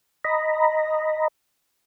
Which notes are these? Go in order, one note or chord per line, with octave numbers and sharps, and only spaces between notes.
D#5 A#5 B5